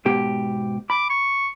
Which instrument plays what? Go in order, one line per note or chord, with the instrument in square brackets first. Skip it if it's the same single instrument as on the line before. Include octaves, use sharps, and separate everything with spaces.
[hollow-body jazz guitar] G#2 B2 G4
[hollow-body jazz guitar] B5 [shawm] D6
[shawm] C#6